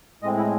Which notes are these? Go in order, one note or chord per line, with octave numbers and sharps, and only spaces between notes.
A2 G#3 C4 D#5
E4